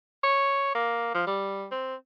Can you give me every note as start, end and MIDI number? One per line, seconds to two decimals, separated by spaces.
0.24 0.71 73
0.75 1.13 58
1.15 1.25 53
1.27 1.66 55
1.72 1.95 60